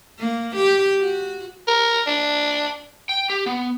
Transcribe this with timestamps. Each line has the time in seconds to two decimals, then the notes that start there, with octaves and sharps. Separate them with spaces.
0.19 A#3
0.55 G4
1.00 F#4
1.68 A#4
2.07 D4
3.09 G5
3.30 G4
3.46 B3